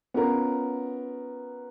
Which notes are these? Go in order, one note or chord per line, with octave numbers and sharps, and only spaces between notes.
B3 C#4 F4 A#4